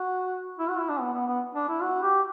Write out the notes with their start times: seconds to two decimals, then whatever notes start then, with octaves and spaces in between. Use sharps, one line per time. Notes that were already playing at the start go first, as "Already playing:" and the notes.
Already playing: F#4
0.59 E4
0.69 F#4
0.79 E4
0.90 D4
1.00 B3
1.14 B3
1.27 B3
1.55 D4
1.69 E4
1.82 F#4
2.02 G4